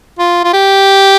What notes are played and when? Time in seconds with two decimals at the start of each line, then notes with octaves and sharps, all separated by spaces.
0.19 F4
0.44 F4
0.53 G4